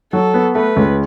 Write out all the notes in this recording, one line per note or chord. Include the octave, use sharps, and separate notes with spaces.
F#3 A4
B3
A3 B4
C#2